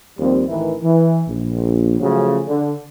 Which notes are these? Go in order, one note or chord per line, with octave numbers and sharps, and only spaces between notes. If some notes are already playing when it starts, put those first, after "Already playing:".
D#2 F3 G3 C4
A1 D#3 E3 E4 A#4 B4
E3
A#1
C#3 F3 F#3 A3 C#4
D3